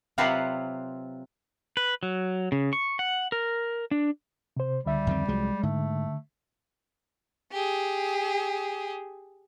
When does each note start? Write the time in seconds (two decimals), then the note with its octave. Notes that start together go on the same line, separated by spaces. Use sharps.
0.18 C3 F#3 C4 F4 B4 F#5
1.77 B4
2.03 F#3
2.52 C#3
2.73 C#6
2.99 F#5
3.32 A#4
3.91 D4
4.57 C3 C5
4.86 C#2 D3 G3 E5
5.07 F2 D#3 C4
5.29 C2 F3 F#3 G#3
5.63 G#2 D3 A3
7.52 G4 G#4